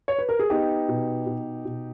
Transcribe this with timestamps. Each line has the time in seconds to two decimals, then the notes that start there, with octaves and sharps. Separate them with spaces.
0.08 C#5
0.18 B4
0.29 A#4
0.39 G#4
0.50 B3 D#4 G4
0.89 B2
1.26 B2
1.65 B2